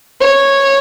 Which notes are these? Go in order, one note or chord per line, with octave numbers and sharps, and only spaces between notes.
C#5